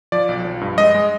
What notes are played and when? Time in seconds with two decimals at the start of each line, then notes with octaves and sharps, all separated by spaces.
0.12 F3 D5
0.29 B1
0.45 F3
0.61 G2
0.78 G#3 D#5
0.94 G#3